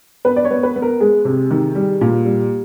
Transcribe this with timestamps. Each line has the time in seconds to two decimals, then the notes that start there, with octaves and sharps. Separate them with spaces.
0.25 B3 B4
0.36 D5
0.45 C#5
0.51 B3
0.63 B4
0.76 B3
0.82 A#4
1.00 G#3 G#4
1.25 C3
1.51 D#3
1.75 G3
2.01 A#2
2.25 G3